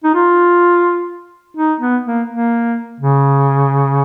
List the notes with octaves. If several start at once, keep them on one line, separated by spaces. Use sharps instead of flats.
D#4
F4
D#4
B3
A#3
A#3
C#3